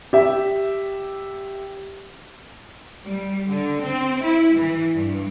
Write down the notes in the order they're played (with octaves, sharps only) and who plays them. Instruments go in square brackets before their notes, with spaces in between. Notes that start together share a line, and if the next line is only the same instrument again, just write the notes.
[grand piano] G4 E5
[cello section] G3
D3
C4
E4
E3
G2